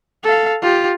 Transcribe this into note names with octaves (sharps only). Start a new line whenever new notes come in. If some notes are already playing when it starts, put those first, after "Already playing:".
A4 F5
F4 G4